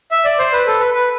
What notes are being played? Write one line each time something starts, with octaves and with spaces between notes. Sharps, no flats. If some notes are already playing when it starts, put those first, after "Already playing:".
E5
D5
C5
B4
A4
B4
B4